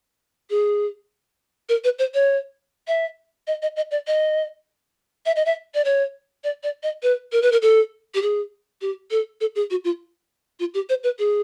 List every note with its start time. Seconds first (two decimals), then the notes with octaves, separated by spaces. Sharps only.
0.50 G#4
1.69 A#4
1.84 B4
1.99 C5
2.14 C#5
2.88 E5
3.47 D#5
3.62 D#5
3.76 D#5
3.91 D5
4.07 D#5
5.26 E5
5.36 D#5
5.46 E5
5.74 D5
5.85 C#5
6.44 D5
6.63 D5
6.83 D#5
7.03 B4
7.32 A#4
7.42 B4
7.52 A#4
7.62 A4
8.14 G4
8.22 G#4
8.81 G4
9.11 A4
9.41 A4
9.55 G#4
9.70 F#4
9.84 F4
10.60 F4
10.74 G4
10.89 C5
11.04 B4
11.19 G#4